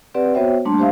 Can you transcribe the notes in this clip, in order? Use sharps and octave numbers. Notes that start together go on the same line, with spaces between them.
C4 G4 B4 D5 F#5
B3 F#4 C5 C#5 E5 G5
G3 A3 A#3 D4 A5 C6
G4 C5 E5 F5